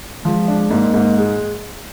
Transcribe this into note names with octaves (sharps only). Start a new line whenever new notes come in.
F3 G#3
D4
G#2 A#3
G#2
G#3